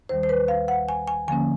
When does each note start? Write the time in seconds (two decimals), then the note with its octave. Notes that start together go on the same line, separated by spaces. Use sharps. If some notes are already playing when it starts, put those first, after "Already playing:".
0.09 D#2 D#3 G3 C5
0.23 C5
0.29 B4
0.48 F5
0.68 F#5
0.89 G#5
1.08 G#5
1.28 D3 F3 A#3 C#4 G#5